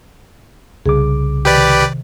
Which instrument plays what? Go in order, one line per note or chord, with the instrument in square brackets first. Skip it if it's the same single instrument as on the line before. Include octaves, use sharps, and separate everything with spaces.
[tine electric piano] C2 C#3 D6 [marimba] G#4
[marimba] C3 D#3 [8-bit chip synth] G4 B4 D5